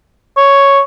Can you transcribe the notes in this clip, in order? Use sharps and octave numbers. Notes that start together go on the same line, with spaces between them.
C#5